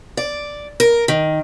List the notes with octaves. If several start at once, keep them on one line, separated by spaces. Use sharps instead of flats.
D5
A#4
D#3